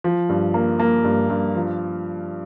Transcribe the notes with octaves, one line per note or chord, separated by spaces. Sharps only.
F3
G2
A#3
A#3
G2
G2
F3